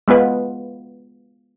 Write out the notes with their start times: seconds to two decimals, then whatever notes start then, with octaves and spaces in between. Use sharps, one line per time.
0.08 G#3 B3 F4 B4